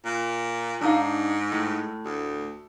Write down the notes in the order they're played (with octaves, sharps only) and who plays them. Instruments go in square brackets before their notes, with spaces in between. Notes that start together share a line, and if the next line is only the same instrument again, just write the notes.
[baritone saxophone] A#2
[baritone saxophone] G#2 [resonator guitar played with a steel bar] D4 D#4 F5
[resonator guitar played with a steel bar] A2
[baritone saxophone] D2